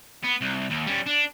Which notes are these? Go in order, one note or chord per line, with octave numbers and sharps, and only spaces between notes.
B3
C2
D#2
G3 C#4
D4